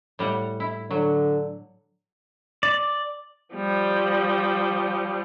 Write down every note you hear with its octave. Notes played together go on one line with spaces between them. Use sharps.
A2 G3 F#5
E4
D3 F#3
D5
F3 G3